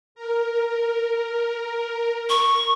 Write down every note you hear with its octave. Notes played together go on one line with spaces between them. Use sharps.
A#4
C#6